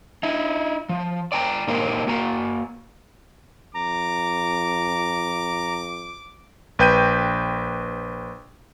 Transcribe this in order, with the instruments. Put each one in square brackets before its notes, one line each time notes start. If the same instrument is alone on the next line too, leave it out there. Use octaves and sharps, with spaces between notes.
[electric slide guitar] D#4 E4
F3
D5 G5 A5 A#5
A#2 A#3 D#4 G4 A#4 C5
A#3 F#4 A#5
[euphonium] F2 [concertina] A#5 [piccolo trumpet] D6
[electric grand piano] A#1 B4 G5 G6 D#7